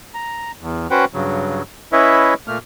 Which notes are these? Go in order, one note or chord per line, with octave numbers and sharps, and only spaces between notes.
A#5
E2
C#4 F#4 B4 C5 F#5 G5
G2 C#3 F#3
C#4 E4 B4 C#5 D#5 E5
A#2 A3 A#3 F6